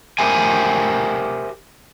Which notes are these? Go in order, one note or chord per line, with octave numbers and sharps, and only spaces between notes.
G4 A#4 C5 E5 G#5